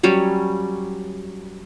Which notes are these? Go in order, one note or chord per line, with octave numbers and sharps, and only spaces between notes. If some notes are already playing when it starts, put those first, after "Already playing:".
F#3 G3 C#4